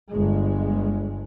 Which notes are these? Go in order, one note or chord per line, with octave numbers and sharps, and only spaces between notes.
G1 G#3